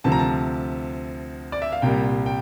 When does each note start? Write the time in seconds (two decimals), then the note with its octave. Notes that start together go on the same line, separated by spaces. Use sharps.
0.04 D2 C3 F3 A5
0.12 A#5
0.19 A5
1.52 D5
1.62 E5
1.72 F5
1.82 C2 A#2 G3 G5
2.26 G5